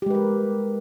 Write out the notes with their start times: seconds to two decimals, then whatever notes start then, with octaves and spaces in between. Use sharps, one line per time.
0.02 G4
0.06 G#3
0.10 B4
0.14 A#4